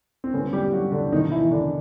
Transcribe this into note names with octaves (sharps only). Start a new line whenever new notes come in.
C4
D3 G3 B3 C#4
G3 G4
F#3 F#4
D3 D4
B2 D#3 F#3 A#3 D#4
E3 E4
D3 D4